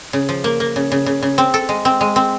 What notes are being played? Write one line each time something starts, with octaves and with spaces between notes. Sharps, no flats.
C#3
F3
A#3
A#3
C#3
C#3
C#3
C#3
C4
A4
G#3
C4
G#3
C4